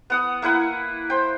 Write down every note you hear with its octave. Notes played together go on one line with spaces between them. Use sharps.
B3 F#5 D#6
A#3 E4 B4 F#5
C5 G5